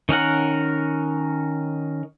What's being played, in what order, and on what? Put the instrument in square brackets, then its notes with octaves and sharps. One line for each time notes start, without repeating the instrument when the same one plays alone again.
[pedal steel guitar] D#3 C#4 A#4 F#5